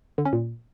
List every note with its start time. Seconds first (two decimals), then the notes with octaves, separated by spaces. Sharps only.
0.18 D3
0.25 C#4
0.33 A#2